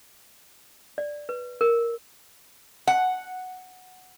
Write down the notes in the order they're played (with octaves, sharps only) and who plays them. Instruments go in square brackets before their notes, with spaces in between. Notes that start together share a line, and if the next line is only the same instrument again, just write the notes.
[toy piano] D5
B4
A#4
[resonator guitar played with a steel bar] F#5